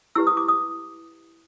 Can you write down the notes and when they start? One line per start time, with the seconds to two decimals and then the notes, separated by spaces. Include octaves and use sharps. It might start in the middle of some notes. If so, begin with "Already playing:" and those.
0.15 E4 G4 B4 E6
0.27 D#6
0.37 D6
0.48 D#6